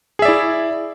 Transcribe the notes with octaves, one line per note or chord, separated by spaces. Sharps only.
E4 G#4 D5 E5